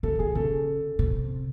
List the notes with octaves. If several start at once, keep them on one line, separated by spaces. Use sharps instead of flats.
C#3 A4
D#3 G#4
C#3 A4
C3